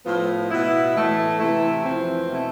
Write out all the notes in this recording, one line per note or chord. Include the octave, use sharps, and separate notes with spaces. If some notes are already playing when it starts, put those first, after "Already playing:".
A2 F3 B3 F4
B2 B3 E4
A2 E3 A3
C3 E3 A3 E4
F2 E3 A3 C4
B2 A3 E4